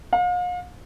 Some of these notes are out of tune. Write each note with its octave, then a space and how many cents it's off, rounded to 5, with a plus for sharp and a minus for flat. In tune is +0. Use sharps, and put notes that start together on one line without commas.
F5 +40